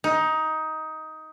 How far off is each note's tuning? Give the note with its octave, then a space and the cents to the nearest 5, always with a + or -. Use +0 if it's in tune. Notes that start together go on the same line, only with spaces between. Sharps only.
D#4 +15